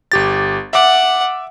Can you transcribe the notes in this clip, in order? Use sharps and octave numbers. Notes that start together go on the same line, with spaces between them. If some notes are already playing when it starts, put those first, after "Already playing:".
G1 G4 A6
E5 F#5 D6